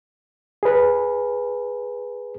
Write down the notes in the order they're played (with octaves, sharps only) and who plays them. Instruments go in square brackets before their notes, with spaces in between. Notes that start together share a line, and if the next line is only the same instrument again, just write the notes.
[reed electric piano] G#4 B4